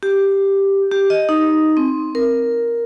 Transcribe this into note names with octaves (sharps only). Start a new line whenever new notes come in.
G4
G4
D#5
D#4
C4
A#4